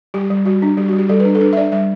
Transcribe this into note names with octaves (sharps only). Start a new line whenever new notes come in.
G3 G4
G3
G3 F#4
D4
G3 G4
G3 F#4
G4
G3 A4
B4
D4
A4
D4 B4
E5
D4 D5
G3 E5